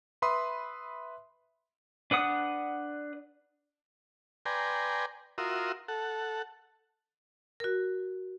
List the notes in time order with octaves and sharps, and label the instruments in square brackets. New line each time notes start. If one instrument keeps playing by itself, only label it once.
[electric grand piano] B4 E5 B5 C6 D#6
[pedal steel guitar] D4 B4 F#5 D#6
[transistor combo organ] B4 D5 G5 G#5 A#5 C6
F4 F#4 A#4 E5 C6 D#6
A4 F#5
[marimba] F#4 A#4